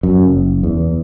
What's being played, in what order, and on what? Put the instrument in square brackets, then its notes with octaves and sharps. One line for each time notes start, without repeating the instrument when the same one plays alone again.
[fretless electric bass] F#2
F#1
E2